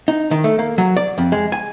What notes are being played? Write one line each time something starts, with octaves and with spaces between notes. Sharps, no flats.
D#4
D#3
A3
A#3
F#3
D5
F2
G#3
G#5